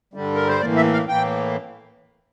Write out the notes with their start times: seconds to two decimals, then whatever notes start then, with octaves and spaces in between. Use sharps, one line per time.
0.14 G2 D3 G3
0.35 A#4
0.48 C5
0.61 A2 E3 A#3 D5
0.77 E5
0.93 F5
1.08 A2 E3 A#3 G5